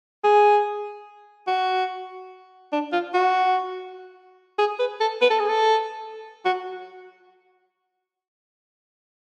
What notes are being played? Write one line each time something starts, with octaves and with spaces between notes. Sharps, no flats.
G#4
F#4
D4
F4
F#4
G#4
B4
A4
B4
A4
G#4
A4
F#4